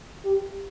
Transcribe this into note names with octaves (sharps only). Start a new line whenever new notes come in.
G4